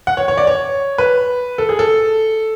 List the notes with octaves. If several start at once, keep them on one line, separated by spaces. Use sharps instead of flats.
F#5
C#5
C#5
D5
C#5
B4
A4
G#4
A4